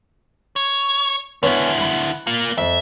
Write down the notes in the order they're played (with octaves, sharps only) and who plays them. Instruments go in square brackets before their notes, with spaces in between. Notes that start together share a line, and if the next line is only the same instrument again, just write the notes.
[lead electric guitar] C#5
[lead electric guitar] D3 E4 [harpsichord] B3 C#4
[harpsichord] F#5 B5
[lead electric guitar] A#3 F4
[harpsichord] F2 [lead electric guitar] E5